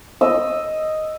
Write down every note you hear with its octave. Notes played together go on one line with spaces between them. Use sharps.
D#5 E6